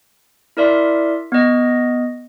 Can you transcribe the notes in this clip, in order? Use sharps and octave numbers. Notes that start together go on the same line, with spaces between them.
E4 A#4 D5 E5 C6
B3 D#5